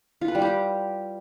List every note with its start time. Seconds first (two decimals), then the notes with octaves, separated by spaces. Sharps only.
0.21 F4
0.28 B4
0.35 G3
0.42 G4